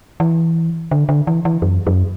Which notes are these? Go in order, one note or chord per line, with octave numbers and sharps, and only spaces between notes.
E3
D3
D3
E3
E3
F#2
F#2